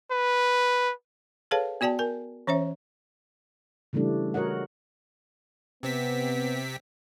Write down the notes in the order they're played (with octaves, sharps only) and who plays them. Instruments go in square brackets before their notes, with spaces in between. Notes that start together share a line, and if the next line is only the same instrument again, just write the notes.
[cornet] B4
[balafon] G#4 A4 B4 C#5 F5 A5
B3 F#4 D5 G5 A5
A#4 G#5
E3 C#4 C5 C#5 E5
[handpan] C#3 E3 G3 A3 D4
F#4 A#4 C#5 D#5 F#5
[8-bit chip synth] C3 C4 B6 [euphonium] B3